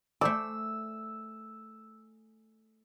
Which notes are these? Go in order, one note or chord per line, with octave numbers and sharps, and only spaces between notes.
A3 C5 D5 E6